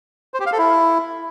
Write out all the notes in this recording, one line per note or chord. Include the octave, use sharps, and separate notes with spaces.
C5
G4
F5
A4
E4